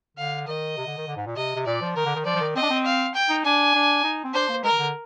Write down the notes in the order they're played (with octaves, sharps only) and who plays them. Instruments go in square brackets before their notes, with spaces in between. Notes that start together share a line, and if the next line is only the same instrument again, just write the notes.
[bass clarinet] D3 [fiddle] F5
[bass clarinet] D#3 [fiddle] D#5
[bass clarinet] C3
D3
D#3
D3
G#2
A#2
[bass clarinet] C3 [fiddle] D#5
[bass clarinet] C3
[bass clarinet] A#2 [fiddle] D5
[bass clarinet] F3
[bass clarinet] D#3 [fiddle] A#4
[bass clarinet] D3
D#3
[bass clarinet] F3 [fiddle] D5
[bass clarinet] F3
D#3
[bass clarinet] C4 [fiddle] D#5
[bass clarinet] D4
C4
[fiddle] F5
G5
[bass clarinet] D#4
[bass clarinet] D4 [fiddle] G#5
[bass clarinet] D4
D#4
C4
[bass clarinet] D4 [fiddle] C5
[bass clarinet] A#3
[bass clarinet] G#3 [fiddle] A#4
[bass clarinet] D#3
D3